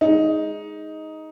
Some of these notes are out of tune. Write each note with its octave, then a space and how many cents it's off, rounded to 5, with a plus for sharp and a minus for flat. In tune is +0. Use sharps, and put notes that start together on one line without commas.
G#3 +0 D#4 +10